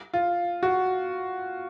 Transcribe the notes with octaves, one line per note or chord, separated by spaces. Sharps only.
F4
F#4